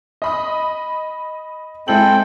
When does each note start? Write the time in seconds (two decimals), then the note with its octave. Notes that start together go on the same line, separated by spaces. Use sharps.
0.22 D#5 B5 D#6
1.88 G#3 C4 E4 A4 G5 F#7